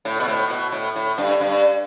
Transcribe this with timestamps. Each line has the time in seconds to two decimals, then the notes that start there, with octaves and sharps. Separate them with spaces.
0.05 A2
0.20 B2
0.28 A2
0.50 B2
0.72 A2
0.96 A2
1.18 G2
1.40 G2